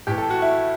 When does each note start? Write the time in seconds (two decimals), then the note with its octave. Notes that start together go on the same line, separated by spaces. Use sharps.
0.07 A2 E3 G4
0.18 A4
0.30 F#4
0.42 E4